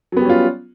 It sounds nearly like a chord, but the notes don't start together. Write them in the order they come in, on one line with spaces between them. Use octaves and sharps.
F#3 B3 G3 C#4 F4